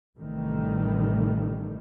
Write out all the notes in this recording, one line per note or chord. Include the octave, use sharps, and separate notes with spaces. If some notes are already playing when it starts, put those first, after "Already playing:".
A1 C3 D#3 E3 G3 A3